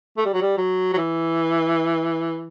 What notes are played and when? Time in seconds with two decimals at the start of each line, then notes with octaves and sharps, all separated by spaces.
0.17 A3
0.26 G3
0.34 F#3
0.42 G3
0.58 F#3
0.93 F#3
0.98 E3